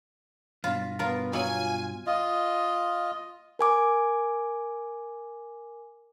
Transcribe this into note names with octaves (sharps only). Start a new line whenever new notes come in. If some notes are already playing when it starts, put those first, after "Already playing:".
G2 B2 F4
B3 F4 A#4
F#3 F4 G#5
F4 D#5
A#4 G#5 D6